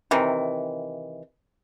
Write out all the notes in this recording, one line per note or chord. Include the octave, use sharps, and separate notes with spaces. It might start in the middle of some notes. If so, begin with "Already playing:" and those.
C3 D#3 E3